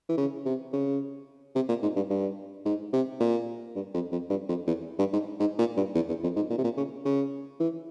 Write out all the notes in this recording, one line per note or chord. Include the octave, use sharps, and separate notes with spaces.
E3
C#3
C3
C#3
C3
A#2
G#2
G2
G2
G#2
C3
A#2
G2
F2
F2
G2
F2
E2
G2
G#2
G#2
A#2
G2
E2
E2
F2
G#2
A#2
C3
A#2
C#3
C#3
E3